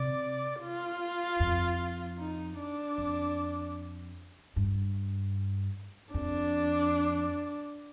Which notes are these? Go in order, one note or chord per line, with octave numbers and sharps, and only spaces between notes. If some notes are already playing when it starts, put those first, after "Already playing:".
Already playing: C3 D5
F4
F2
D#4
D4
F2
G2
F2 D4